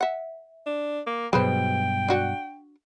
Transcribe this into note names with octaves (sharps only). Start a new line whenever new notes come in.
E5 F#5
D4
A#3
G2 B2 F#3 G#4 B4 C5 G5
D4 F#4 F#5